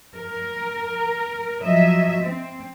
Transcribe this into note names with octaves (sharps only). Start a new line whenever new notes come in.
A#4
F3 F#3 D#5 E5
C4